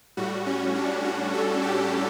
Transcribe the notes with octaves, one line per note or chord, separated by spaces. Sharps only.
A2 G3 F#4
C#4
D4
F#4
A4
G4